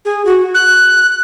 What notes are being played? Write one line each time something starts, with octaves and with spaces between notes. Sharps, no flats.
G#4
F#4
F#6